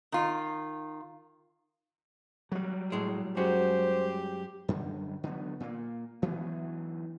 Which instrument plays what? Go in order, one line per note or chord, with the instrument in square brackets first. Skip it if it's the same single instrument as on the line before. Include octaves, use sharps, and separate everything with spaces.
[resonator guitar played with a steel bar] D#3 F4
[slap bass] F#3 G3
[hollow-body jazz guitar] A2 G#3
[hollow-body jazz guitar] F#2 G#3 F#4 [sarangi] G4 [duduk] C5
[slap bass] F#2 D3 G3
D3 F#3 B3
A#2 A#3
D2 E3 F#3 B3